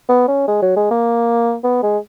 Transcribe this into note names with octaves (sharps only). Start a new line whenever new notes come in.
B3
C#4
G#3
F#3
G#3
A#3
B3
G#3